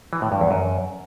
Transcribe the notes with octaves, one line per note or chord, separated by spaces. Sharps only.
E3
A2
G2
E2
F#2